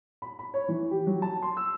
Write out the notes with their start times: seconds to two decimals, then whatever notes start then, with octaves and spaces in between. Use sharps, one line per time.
0.22 B5
0.39 B5
0.54 C#5
0.68 E3
0.91 G4
1.07 F#3
1.22 A5
1.42 C6
1.57 E6